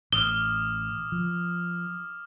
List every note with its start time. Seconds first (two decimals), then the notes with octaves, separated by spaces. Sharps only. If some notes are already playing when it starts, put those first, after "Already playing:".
0.12 A1 D6 D#6 F6 G7
1.12 F3